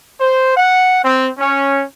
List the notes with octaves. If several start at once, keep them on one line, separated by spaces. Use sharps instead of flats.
C5
F#5
C4
C#4